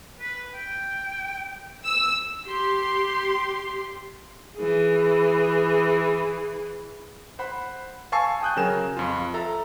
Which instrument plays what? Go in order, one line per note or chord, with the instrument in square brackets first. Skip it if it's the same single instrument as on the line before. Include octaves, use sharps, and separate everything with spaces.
[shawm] B4
G5
[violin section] E6
[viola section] G4 C6
[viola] E3 G#4
[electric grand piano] C5 F#5 B5
F5 G#5 A5 C#6 E6 C7
G5 D#6 F#6 G6
C#3 F#3 A#4 G#5 E7
F2 F4
A4 E5 A#5